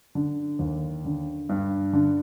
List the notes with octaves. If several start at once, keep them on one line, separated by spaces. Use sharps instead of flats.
D3
D#2
D3
G2
D3